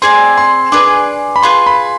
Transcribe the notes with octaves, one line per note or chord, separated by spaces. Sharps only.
C4 G#4 D5 G#5 C6
C6
D4 G#4 B4 D6
B5
F4 G#4 B4 C6
B5